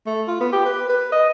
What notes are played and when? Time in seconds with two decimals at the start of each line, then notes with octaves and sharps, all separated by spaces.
0.06 A3
0.28 F4
0.40 B3
0.53 G4
0.66 B4
0.89 B4
1.12 D#5